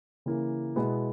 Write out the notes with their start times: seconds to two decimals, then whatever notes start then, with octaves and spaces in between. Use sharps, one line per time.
0.26 C#3 E3 A#3
0.76 B2 G#3 B3 E4